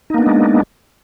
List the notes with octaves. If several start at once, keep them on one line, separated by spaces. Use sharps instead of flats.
G#3 A#3 B3 D4 D#4